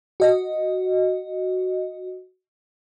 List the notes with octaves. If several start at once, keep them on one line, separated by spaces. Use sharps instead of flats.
F#4 D#5